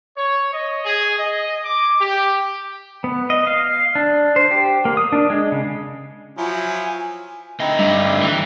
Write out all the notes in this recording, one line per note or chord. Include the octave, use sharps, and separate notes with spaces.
C#5
D#5
G#4
D#5
D6
G4
B3
D#5
F5
D4
C5
G4
A#3
D#6
D4
G#3
C#3
F3 F#3 E4 F4 G#5
D3 A3 C4 D#4 E4 D#5
G2
E3